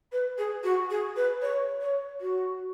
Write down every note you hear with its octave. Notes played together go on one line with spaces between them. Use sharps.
B4
G#4
F#4
G#4
B4
C#5
C#5
F#4